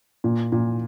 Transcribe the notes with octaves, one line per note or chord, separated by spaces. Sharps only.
A#2
A#2